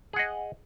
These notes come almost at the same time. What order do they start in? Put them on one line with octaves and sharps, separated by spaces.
G#4 F#5 D#5